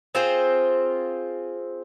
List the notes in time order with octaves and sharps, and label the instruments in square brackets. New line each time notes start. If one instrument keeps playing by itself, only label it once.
[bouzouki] C4 F4 G#4 C5